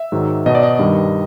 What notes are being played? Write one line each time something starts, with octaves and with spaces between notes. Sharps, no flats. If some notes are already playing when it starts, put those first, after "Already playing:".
Already playing: E5
G#2 D#3 F#3
B2 F#3 D#5
D5
D#5
G2 D#3 G3